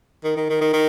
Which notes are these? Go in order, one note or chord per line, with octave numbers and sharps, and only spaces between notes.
D#3
D#3
D#3
D#3
D#3